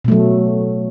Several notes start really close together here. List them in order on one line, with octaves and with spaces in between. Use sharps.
B2 A3 F#3